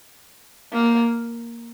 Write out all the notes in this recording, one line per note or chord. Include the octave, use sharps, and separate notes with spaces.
A#3